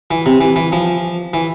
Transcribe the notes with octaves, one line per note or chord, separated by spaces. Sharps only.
E3
C3
E3
E3
F3
E3